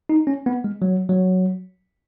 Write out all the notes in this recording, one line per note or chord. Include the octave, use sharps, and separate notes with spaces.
D#4
C#4
B3
G#3
F#3
F#3